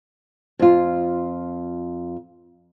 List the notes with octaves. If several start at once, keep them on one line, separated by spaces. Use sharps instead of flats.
F2 F4